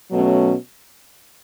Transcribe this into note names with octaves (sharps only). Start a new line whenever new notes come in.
B2 F#3 A3 C#4